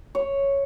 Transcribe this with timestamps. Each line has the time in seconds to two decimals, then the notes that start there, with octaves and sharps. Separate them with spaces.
0.15 C#5